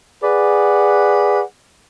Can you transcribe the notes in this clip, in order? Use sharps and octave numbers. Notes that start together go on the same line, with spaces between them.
G#4 B4 D5 F#5